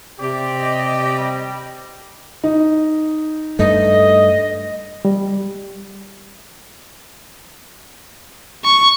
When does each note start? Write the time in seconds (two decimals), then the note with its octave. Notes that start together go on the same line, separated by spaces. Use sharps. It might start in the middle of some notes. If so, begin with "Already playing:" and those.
0.20 C3 C4 G4 D5
0.55 D#5
1.18 G3
2.44 D#4
3.59 G2 A3 D#5
5.05 G3
8.64 C#6